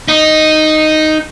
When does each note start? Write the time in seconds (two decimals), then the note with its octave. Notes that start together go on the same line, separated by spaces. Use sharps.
0.08 D#4